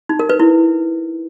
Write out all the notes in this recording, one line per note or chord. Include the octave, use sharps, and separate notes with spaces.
D#4
A#4
B4
E4